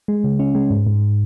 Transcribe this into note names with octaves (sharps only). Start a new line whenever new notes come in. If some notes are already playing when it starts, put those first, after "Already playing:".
G#3
C#3
C#4
G#3
G#2
G#2